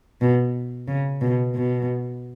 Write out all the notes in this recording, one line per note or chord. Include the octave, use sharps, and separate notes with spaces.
B2
C#3
B2
B2